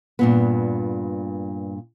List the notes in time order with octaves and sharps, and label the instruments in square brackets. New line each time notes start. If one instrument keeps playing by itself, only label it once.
[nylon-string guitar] G2 A#2 B3